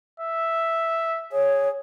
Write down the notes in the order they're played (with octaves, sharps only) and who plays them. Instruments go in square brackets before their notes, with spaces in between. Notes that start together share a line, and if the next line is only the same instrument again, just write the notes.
[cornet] E5
[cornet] G#4 [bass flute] C#5